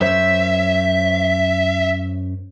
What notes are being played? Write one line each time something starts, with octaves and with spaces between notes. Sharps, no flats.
F#2 C5 C#5 E5